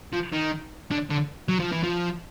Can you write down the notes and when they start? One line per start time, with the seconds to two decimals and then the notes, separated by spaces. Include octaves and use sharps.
0.13 F3
0.32 D#3
0.91 D3
1.10 D3
1.48 F#3
1.60 F3
1.72 E3
1.84 F3